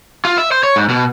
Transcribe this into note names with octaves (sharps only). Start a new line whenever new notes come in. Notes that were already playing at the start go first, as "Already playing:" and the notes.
F4
E5
C5
C#5
G#2
B2